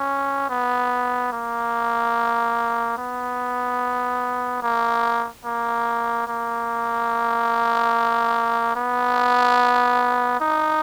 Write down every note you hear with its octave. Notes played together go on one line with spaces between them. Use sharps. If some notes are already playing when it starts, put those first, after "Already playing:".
Already playing: C#4
B3
A#3
B3
A#3
A#3
A#3
B3
D#4